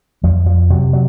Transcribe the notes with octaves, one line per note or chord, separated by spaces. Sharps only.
F2 F3
F3
C3 F#3
F#3